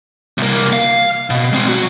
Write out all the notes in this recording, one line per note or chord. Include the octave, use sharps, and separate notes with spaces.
C2 A#3
F5
B2
G#3 C4
F#3 F#4